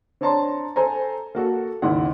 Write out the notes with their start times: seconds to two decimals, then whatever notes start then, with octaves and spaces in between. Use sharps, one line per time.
0.21 C4 D4 C#5 A5 A#5 C6
0.76 A4 C5 G#5 A#5
1.35 A#3 F#4 A4
1.82 G#1 D#2 C#3 E4 F#5 C6